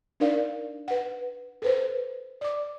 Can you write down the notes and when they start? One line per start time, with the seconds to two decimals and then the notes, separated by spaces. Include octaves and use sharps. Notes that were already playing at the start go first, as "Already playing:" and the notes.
0.20 D4 D#4 A#4 D5 F5
0.88 B4 F#5
1.62 A4 B4 C5
2.41 D5 D6